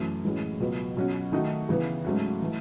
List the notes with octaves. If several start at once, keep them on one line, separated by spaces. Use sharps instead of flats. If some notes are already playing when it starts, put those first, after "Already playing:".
Already playing: F#2 E3 A3 C#4
A2 E3 G#3 C#4 F#4
C#2 B2 F#3 B3
B2 F#3 C#4 F#4
D#3 A3 D#4 F#4
C#3 E3 B3
G#2 F#3 A3 C#4 F#4
E3 A3